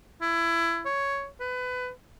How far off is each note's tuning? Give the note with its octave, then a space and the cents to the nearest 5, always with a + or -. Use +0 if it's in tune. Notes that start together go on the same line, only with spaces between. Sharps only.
E4 +25
C#5 +5
B4 +25